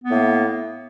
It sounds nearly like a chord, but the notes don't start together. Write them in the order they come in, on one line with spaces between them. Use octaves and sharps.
B3 A#3 A2